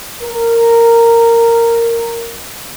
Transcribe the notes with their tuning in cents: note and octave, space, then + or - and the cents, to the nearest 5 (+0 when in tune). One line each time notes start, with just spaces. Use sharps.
A#4 -10